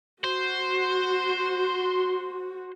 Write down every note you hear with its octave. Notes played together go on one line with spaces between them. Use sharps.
F#4 C5